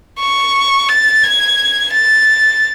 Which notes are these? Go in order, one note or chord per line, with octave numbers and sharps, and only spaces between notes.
C#6
A6
G#6
A6